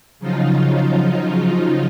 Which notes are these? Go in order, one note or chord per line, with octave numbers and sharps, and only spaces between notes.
C#3 F3 F#3 D#4 F4